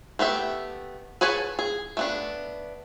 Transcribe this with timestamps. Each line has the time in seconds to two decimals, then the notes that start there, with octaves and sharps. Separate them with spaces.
0.19 A3 B3 G4 E5
1.21 G#4 B4 C#5 G#5 A5
1.59 G#4
1.97 A3 B3 D4